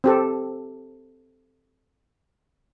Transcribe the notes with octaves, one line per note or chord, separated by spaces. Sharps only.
C4 G4 A4